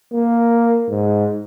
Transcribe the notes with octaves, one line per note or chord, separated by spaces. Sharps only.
A#3
G#2